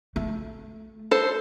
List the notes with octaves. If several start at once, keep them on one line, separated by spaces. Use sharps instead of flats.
A3
A4 C5